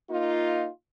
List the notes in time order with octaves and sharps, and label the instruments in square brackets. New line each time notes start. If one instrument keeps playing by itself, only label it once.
[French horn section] A#3 D#4 F4